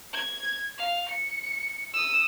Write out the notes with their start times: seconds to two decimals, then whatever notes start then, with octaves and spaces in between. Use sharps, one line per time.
0.13 G#6
0.78 F5
1.09 C#7
1.94 D#6 E6